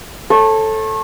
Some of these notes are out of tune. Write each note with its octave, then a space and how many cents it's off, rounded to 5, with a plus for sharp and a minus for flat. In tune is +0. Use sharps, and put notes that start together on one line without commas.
A4 +0 C#5 -35